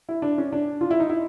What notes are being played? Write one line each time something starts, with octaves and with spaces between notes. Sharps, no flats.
E4
D4
C#4
D4
F4
E4
D#4
E4